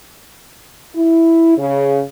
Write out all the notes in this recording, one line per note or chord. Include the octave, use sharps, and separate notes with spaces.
E4
C#3